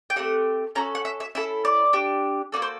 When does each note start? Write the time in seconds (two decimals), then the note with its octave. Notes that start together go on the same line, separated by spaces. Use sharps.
0.10 G5
0.16 A3 C4 G4 F#5
0.75 C#4 F#4 A4 A#5
0.95 F#5
1.05 E5
1.20 E5
1.35 C#4 E4 A4 E5
1.65 D5
1.93 D4 G4
2.52 A#3 D#4 F#4 A4 D5
2.62 C5